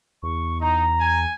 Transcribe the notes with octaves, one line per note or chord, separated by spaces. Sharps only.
E2 C#6
D#4 A#5
G#5